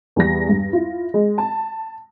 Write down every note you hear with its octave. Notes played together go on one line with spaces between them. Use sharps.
E2 G3 A#6
G2
E4 F4
G#3
A5